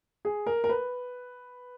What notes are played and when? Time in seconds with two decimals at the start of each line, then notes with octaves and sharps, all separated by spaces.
0.25 G#4
0.46 A#4
0.64 A#4
0.69 B4